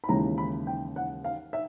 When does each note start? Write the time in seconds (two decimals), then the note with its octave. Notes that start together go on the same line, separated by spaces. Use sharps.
0.04 B5
0.09 D#2 C#3 E3 G#3 A#5
0.38 B5
0.67 G5
0.96 F#5
1.25 F5
1.53 E5